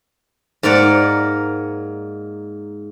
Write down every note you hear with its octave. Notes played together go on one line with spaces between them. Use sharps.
G#2 A#3 A#4 D5 F#5